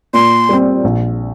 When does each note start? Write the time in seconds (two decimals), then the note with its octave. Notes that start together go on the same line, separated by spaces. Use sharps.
0.13 A#2 C6
0.49 G3 C4
0.84 A#1